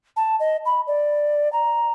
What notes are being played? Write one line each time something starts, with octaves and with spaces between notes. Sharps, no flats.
A5
D#5
B5
D5
A#5